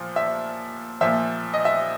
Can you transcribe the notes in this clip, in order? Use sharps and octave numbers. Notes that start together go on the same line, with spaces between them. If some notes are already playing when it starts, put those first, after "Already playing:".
Already playing: A#2 F3
E5
A#2 F3 E5
D#5
E5